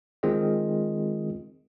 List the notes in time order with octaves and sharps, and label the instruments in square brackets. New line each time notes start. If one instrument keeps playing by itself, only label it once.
[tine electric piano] D#3 G#3 C4 F4 G#4 D#5